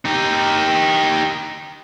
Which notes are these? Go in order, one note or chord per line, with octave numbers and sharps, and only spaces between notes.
D#4 G4